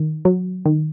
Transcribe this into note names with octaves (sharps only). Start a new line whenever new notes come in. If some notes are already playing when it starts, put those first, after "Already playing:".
Already playing: D#3
F#3
D#3